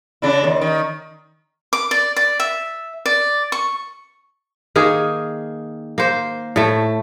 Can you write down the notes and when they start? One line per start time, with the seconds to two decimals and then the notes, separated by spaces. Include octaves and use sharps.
0.22 C#3 D4 E4
0.44 D#2
0.61 D#3
1.73 D6
1.91 D5
2.16 D5
2.40 E5
3.06 D5
3.52 C#6
4.76 D#3 A#3 G#4
5.98 A#3 C5
6.56 A2 A3